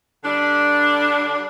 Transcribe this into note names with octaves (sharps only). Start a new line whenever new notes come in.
D3 G3 D4